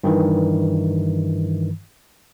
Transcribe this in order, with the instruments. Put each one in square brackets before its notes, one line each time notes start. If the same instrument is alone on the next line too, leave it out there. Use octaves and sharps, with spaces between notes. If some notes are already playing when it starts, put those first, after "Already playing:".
[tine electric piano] G2 D#3 E3